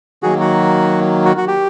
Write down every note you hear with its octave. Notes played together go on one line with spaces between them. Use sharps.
D#3 F#3 A#3 F#4 G#4
F#4
F#4
F#4
G4